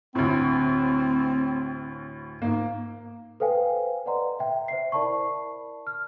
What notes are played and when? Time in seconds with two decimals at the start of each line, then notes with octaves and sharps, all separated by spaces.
0.15 D2 A2 C4
2.42 G#2 A#3
3.40 A4 B4 C5 F5 G5 G#5
4.06 B4 D5 D#5 F#5 A#5 C6
4.39 E5 G5
4.68 C5 E5 C7
4.92 E4 A#4 D5 A5 B5 C#6
5.87 F6